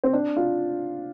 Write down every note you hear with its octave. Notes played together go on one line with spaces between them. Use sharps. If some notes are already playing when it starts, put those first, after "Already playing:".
C4
D4
F4